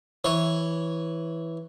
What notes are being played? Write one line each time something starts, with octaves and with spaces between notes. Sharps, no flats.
E3 C#5